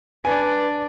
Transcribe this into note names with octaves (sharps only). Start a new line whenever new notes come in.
D4 B4 D5 G#5